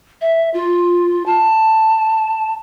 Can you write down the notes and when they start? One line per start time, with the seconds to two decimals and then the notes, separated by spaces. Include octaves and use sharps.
0.21 E5
0.54 F4
1.26 A5